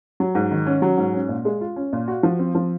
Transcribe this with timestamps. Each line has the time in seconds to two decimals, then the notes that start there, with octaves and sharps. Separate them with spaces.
0.20 F#3
0.35 G#2
0.51 D#3
0.66 C#4
0.82 F#3
0.98 G#2
1.14 C#4
1.29 A#2
1.45 G#3
1.61 F4
1.76 C#4
1.93 A#2
2.08 F#4
2.23 F3
2.39 C4
2.55 F3